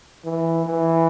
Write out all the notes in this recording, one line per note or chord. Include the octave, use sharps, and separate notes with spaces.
E3
E3